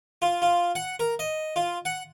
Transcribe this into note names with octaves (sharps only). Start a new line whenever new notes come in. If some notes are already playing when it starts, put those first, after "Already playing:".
F4
F4
F#5
A#4
D#5
F4
F#5